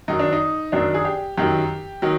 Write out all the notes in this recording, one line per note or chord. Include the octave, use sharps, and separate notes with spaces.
F#2 D#3 F#3 D#4
D4
D#4
F#2 D#3 F#3 D4
G#4
G4
F#2 D#3 F#3 G4
D#3 F#3